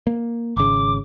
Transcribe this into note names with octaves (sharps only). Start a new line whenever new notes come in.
A#3
G#1 C#3 D6